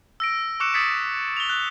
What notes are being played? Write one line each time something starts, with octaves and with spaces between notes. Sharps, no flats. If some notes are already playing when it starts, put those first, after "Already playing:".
E6 A#6 D7
C#6 D6 E6 F#6 C#7 E7
D#6 G#6 A6 B6 C#7
F7 G7
F#6